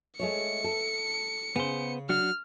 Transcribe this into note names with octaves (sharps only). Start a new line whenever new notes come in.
G#3 A3 C#5 C#7
A4
C#3 B3 C5
F#3 D4 F#4 F6